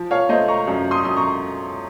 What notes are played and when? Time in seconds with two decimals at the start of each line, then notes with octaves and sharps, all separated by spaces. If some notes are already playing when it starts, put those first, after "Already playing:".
Already playing: F3
0.11 C#5 F5
0.29 A3 C5 D#5
0.48 A#5 C#6
0.67 F#2
0.91 C6 D#6
1.04 F#2 D#6
1.17 A#5 C#6